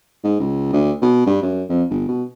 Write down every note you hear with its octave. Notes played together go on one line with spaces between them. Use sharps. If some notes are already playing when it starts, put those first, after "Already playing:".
G#2
C#2
D2
B2
G2
F#2
F2
G1
B2